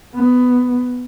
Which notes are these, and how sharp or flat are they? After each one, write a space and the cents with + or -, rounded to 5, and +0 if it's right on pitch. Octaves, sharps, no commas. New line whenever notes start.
B3 +10